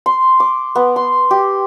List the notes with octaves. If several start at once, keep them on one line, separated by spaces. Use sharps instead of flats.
C6
D6
B3
C6
G4